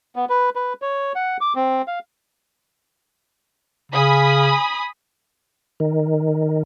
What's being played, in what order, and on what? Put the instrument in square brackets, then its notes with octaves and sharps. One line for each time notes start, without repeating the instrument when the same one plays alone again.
[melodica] B3
B4
B4
C#5
F#5
D6
C4
F5
[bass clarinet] C#3 [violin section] G#5 B5 D#6
[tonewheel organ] D#3